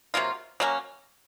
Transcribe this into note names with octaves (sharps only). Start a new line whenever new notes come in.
C3 F#3 A#3 F4
F#3 A#3 C#4